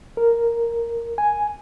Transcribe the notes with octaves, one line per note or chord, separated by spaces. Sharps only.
A#4
G#5